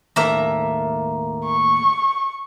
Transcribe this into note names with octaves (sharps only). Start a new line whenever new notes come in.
D#2 A2 A#3 A4 E5 A#5
C#6